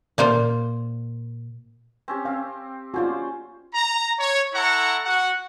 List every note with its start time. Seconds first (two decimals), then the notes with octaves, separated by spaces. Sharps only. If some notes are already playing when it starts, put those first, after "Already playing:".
0.18 A#2 A#3 F4 C5
2.08 C4 C#4 G4
2.25 C4 F5
2.94 C#4 F4 F#4 C5 D5
3.74 A#5
4.20 C#5
4.54 E4 A4 F#5 A#5 C#6
5.05 F#4 F#5